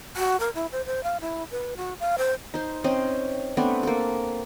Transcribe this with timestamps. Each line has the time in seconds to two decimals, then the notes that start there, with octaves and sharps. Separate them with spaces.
0.17 F#4
0.40 A#4
0.55 E4
0.72 C5
0.86 C5
1.03 F5
1.21 E4
1.51 B4
1.77 F#4
2.00 F5
2.18 C5
2.54 D#4 C5
2.84 C4 C#4 C5 D#5
3.57 A3 B3 C4 D4
3.83 A#3 A4